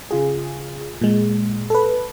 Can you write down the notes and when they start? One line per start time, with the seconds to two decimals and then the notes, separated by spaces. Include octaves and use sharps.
0.11 C#3 F4 G#4
1.01 A#2 G#3
1.70 A4 B4